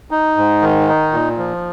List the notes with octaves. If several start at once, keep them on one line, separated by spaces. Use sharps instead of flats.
D#4
G#2
D#3
D#4
A#2
F3